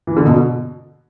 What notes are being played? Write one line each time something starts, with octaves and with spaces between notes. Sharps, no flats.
E3
D3
B2